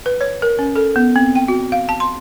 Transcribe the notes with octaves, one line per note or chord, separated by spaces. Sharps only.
B4
C#5
A#4
C#4
A4
B3
C4
G5
F#4
F5
A5
C6